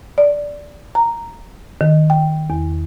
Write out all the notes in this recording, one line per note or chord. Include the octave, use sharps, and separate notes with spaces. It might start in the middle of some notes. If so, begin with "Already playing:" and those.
D5
A#5
D#3
G5
E2